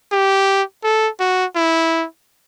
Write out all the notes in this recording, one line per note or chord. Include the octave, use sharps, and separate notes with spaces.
G4
A4
F#4
E4